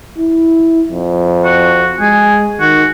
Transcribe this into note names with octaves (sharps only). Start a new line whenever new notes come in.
E4
F2
F#4
G#3 G#4
D#3 F#4